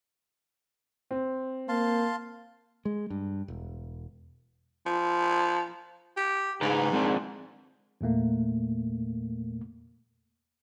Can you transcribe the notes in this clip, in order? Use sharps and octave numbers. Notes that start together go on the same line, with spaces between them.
C4
A#3 F5 A5 C6
G#3
G2
E1
F3
G4
G#2 C#3 B4 A#5
G#3 C4 D4
E2 A#2 A3 A#3